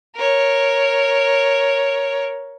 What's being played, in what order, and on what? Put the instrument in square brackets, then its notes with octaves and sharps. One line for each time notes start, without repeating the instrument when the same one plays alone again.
[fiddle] A#4 C#5